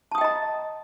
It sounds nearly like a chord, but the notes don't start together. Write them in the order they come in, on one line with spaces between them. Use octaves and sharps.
A5 D#6 G5 D#5 A#5